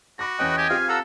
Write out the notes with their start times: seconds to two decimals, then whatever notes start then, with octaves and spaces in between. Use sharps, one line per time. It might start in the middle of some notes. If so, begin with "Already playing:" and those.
0.19 F#4 B5 D6 A#6
0.39 E2 C#4 B4 D#5 G5 F#6
0.58 G4 G#5
0.70 C4 F4 G4 F5
0.89 A4 F#5 A#5 E6